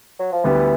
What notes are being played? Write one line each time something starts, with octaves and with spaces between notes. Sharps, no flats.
F#3
F3
D2 D3 E3 G3 B3